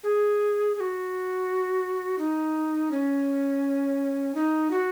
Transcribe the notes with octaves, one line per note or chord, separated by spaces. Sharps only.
G#4
G#4
F#4
D#4
C#4
D#4
F#4